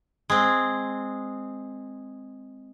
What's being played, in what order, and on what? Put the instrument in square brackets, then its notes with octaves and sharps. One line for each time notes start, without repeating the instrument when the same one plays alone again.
[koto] G#3 C4